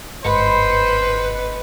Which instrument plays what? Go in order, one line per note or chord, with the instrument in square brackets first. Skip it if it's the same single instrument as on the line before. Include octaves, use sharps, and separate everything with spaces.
[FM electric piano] G1 G#2 C#7 [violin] B4 [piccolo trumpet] C5 [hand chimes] D#5 B5